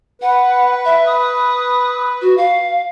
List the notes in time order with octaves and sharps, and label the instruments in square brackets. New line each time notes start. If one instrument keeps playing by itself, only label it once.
[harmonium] B4 [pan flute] F#5
[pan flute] E5
D#6
F#4
F5